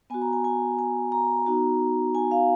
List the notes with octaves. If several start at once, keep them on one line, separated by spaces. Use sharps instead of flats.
B3 F#4 G#5
A#5
G#5
G#5
G#5
A#5
B3 D#4 F#4
G#5
F5